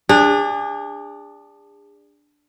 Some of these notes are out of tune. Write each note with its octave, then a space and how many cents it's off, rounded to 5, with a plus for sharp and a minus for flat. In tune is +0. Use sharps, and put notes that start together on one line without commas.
D4 +0 G#4 -35